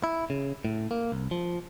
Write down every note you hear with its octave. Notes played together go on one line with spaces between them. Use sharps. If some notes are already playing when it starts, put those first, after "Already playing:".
E4
C#3
A2
A#3
C2
F3